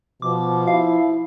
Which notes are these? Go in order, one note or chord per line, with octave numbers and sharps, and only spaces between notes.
B2 F3 D6
E4 F5